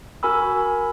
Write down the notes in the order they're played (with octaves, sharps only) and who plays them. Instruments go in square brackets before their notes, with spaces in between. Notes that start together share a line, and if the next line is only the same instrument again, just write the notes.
[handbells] F#4 A#4 G#5 B5 E6